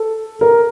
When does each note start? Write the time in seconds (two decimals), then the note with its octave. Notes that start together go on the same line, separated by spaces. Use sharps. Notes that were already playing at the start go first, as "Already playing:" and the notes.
Already playing: A4
0.41 A#4